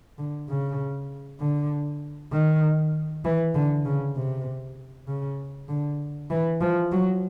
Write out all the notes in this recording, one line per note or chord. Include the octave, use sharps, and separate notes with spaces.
D3
C#3
D3
D#3
E3
D3
C#3
C3
C#3
D3
E3
F3
F#3